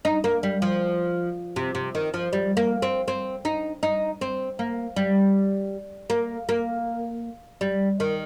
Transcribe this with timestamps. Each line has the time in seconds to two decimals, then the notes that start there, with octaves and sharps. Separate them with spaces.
0.05 D#4
0.24 A#3
0.43 G3
0.62 F3
1.56 C3
1.75 C3
1.95 D#3
2.14 F3
2.33 G3
2.57 A#3
2.82 C4
3.08 C4
3.45 D#4
3.83 D#4
4.21 C4
4.59 A#3
4.96 G3
6.10 A#3
6.49 A#3
7.61 G3
8.00 D#3